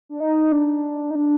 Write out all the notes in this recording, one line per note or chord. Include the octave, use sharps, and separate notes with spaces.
D4
D#4
D4
D#4
D4